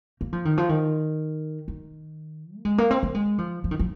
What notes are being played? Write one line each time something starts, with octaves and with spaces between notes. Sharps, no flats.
A#3
F3
D#3
F3
D#3
D#3
A#3
G#3
A#3
C4
A#3
G#3
F3
F3
D#3
F3